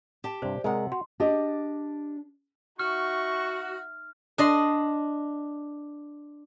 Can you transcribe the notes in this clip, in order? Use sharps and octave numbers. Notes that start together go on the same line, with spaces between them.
G4 A5
G2 C3 C5 D5
C3 G#3 A#4 F#5
F#4 C6
D4 G4 D5 D#5
D#4 F#4 E5 C#6 F6
D4 D#5 C6